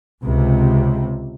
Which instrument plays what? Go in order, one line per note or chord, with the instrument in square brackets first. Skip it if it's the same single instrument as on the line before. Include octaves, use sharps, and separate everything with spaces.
[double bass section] C#2 C3